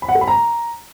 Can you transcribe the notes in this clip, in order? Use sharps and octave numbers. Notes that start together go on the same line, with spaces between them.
B5
F#5
A4
B5
A#5